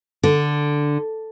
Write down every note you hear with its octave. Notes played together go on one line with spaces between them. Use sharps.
D3